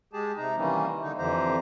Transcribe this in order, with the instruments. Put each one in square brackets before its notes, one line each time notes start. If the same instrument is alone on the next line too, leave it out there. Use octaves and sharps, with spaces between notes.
[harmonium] G#3 G4 G#4 A5
C3 D#4 A#5
D#3 E3 G3 A#3 C#4
D3 D#4
F2 D3 E3 G4 C5 A#5